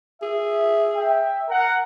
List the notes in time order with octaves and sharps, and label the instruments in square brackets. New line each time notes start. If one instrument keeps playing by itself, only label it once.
[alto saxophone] G#4 [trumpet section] E5
[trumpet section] E5 G5
A#4 F#5